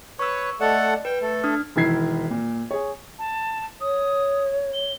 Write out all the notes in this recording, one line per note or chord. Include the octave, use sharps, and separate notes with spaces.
B4 C#5 C#6 E6
A3 A4 D5 D#5 F#5
B4 G5
A3 A4
D4 D#6 F6
E1 D#3 E4 G#6 C7
A#2
G#4 C#5
A5
C#5 D#6
G7